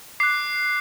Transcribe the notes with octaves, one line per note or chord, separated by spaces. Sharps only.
D6 F#6 C7